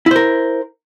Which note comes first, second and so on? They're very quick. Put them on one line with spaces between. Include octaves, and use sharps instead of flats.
E4 C5 A#4